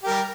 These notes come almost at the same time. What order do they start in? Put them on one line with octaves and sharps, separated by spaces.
G4 A#4 G3